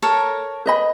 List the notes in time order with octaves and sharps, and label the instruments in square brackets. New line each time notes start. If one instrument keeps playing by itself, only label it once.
[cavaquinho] A4 A#4 C#5
[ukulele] B4 D#5 B5